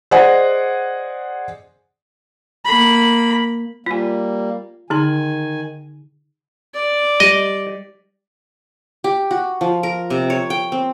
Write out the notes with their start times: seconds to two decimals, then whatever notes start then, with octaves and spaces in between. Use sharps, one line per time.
0.11 G#4 C5 D5 D#5 F#5 G#5
2.65 A#3 B5
3.86 G3 A#3 F4 G#5
4.90 D3 D#3 D#4 G#5 C6
6.74 D5
7.20 G3 D#5
9.04 G4
9.31 F#4
9.61 F3
9.83 A#4
10.10 C3
10.30 C#5
10.50 G5
10.72 C4